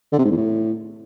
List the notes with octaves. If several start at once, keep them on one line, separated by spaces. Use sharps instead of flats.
D3
C3
G#2
E2
A2